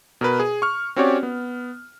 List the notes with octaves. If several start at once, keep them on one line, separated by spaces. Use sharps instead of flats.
B2 A#4 B4
G#4
C#6 F6
C4 C#4 F#4 G4 C#5 D5
B3